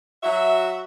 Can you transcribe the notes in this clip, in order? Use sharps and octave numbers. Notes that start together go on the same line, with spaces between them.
F#3 F#4 E5